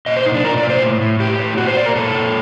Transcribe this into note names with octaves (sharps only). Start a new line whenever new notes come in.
A#2 D#5
C5
A#2 D#4
D4
A#2 A#4
D5
A#2
C5
A2
A2
A2 G4
A2
A#2 F#4
C5
A#2 D5
A#4
A#2 A4
A#2